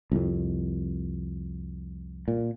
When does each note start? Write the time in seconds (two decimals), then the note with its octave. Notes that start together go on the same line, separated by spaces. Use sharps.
0.12 C2 F2
2.28 A#2